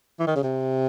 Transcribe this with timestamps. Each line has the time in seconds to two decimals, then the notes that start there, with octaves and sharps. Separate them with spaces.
0.20 E3
0.27 D#3
0.36 C#3
0.43 C3